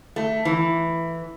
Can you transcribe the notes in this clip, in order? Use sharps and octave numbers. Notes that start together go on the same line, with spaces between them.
A3
E3